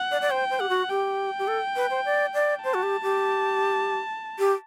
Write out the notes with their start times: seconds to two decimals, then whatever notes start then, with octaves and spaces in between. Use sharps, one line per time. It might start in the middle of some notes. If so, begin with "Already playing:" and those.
Already playing: F#5
0.11 D5
0.21 D5
0.31 C5 G5
0.50 C5
0.60 G4 F#5
0.69 F#4
0.89 G4 G5
1.39 G4
1.48 A4
1.76 B4
1.90 C5
2.05 D5
2.34 D5
2.63 C5 A5
2.74 F#4
2.83 G4
3.03 G4
4.39 G4